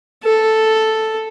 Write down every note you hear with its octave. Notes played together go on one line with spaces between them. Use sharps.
A4